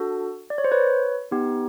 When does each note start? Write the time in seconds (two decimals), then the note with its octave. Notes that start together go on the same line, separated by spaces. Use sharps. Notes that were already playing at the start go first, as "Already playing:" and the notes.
Already playing: D4 F#4 A4
0.50 D5
0.58 C#5
0.64 C5
0.72 B4 C#5
1.31 B3 D#4 G4